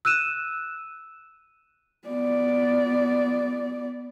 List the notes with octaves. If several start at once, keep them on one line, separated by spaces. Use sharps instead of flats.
E6 F#6 D#7 E7
B3 D5